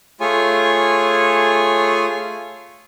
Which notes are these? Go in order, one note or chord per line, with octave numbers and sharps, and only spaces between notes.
A3 F4 G#4 C#5 G#5